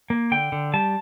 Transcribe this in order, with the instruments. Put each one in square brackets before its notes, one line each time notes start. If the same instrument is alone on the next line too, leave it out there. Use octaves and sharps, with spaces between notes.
[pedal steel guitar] A#3
D3 G5
D3
G3 A5